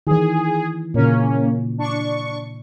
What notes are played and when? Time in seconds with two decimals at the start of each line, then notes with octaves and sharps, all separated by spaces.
0.07 D#3 E3 G#4
0.94 A#2 C#3 A#3 C#4
1.78 D4 C#6